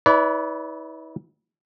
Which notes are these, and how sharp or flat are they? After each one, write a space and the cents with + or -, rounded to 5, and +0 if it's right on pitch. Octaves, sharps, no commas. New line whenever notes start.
E4 -45 B4 +0 D5 -40